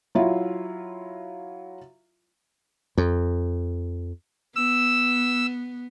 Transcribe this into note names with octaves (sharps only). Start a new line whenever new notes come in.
F#3 E4 F4 E5
F2
B3 E6